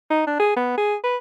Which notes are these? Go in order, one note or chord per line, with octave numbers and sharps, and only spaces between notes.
D#4
D4
G#4
B3
G#4
B4